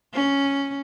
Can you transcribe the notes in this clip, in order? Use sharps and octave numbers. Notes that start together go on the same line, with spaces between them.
C#4